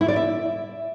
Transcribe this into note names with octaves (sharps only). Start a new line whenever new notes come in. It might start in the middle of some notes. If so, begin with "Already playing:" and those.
E4
D5
E5